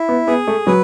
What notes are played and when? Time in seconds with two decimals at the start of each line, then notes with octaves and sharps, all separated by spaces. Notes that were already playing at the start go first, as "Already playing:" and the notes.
Already playing: E4
0.09 B3
0.27 B3 G#4
0.47 A3
0.67 F#3 B4